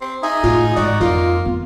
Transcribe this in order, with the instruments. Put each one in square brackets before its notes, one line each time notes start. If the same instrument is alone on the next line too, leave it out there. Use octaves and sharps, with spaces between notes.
[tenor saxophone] C4
[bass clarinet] D#4 [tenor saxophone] G#4 [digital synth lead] E5
[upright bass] A2 [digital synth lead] F4
[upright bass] G#2 [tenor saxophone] F#4 [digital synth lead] D5
[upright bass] F2 [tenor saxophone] A#3 [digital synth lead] F4
[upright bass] B3